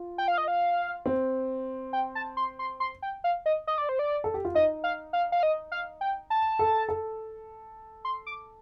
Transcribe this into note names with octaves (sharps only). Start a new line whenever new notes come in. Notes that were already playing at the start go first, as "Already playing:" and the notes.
Already playing: F4
G5
F5
D#5
F5
C4
G5
A5
C6
C6
C6
G5
F5
D#5
D#5
D5
C5
D5
A4
G4
F4
D#4 D#5
F5
F5
F5
D#5
F5
G5
A5
A4
A4
C6
D6